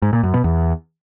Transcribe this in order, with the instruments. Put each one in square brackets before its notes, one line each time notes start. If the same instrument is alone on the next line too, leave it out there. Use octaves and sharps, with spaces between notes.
[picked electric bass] G#2
A#2
F#2
B2
E2